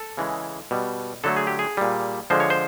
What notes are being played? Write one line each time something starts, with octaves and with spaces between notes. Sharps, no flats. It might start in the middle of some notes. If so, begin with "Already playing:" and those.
Already playing: A4
C#3 E3 G#3
B2 G3
D3 F#3 A3 A4
G#4
G4
G#4
A#2 G3
D3 F3 G#3 C5
C#5
C5